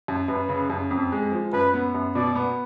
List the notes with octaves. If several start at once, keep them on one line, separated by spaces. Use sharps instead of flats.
F#2
F#2 B4
C#3
F#2
F2
G#3
F3
F#2 B4
B3
F#2
B2 D5
B3